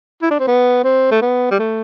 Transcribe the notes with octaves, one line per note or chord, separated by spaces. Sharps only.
E4
D4
C4
B3
C4
A3
B3
G3
A3